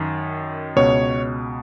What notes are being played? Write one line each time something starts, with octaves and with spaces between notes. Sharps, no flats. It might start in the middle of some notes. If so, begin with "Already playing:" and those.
Already playing: F#2 D#3
C#2 B2 C#5